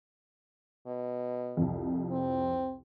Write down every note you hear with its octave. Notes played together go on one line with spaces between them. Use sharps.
B2
C2 F2
C4